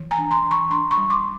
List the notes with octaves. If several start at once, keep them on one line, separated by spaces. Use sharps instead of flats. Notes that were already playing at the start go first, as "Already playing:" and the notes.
Already playing: E3
G#5 A#5
D4
A#5 C6
E3
B5 C#6
D4 A#5 C6
B5 C#6
G3
C6 D6